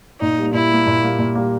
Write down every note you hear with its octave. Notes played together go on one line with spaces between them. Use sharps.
A#2 D#4
G3 A#3
A#2 E4
G3 A#3
A#2
G3 A#3
A#2
G3 A#3